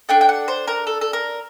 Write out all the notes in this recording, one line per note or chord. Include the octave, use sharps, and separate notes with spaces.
D4 A4 G5
G5
F#5
C5
A#4
A4
A4
A#4